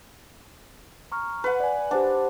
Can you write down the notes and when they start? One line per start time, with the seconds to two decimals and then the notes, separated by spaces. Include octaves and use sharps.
1.12 A#5 C#6 F6
1.44 B4 F#5
1.60 D5 G#5
1.91 D4 G4 C5 F#5